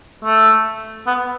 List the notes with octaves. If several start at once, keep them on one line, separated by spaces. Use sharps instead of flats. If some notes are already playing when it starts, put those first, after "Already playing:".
A3
B3